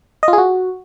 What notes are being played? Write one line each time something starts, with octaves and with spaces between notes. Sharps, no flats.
D#5
F4
G#4
F#4